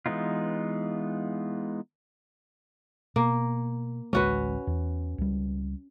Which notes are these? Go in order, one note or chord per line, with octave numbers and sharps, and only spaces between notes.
E3 G#3 B3 D#4 F4
B2 A#3
A1 D2 G#3 C#4 F#4 B4
E2
C#2 G3